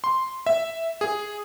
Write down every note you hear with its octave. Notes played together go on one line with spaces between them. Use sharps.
C6
E5
G#4